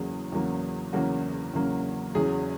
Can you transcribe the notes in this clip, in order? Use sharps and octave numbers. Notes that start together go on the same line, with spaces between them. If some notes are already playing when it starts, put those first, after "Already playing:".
Already playing: E2 C#3 F#3 A#3 G#4
E2 C#3 F#3 A#3
E2 C#3 F#3 A#3 F#4
E2 C#3 F#3 A#3
E2 C#3 F#3 G#4